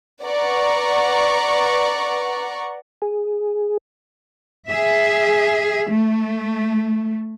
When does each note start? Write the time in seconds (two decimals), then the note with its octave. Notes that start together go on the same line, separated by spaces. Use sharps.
0.23 B4 D5 F#5 A#5 C#6
3.02 G#4
4.69 G#4 E5
5.90 A3